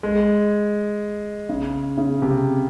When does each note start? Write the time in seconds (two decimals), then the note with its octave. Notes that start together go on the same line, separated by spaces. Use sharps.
0.03 G#3
1.49 C#3
1.98 C#3
2.22 C3